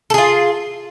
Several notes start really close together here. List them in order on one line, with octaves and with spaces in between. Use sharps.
A4 G#4 F4